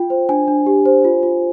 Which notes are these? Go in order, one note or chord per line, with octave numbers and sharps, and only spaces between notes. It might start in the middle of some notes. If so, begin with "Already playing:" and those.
Already playing: F4 G5
C5
D4 G#5
D4
G4
C5
F4
F4